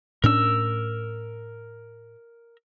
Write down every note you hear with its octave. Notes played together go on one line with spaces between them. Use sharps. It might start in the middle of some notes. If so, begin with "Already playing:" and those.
A2 C#4 D4 A#4 E6